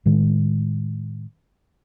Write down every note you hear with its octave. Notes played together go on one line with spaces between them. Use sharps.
A2 D#3 G#3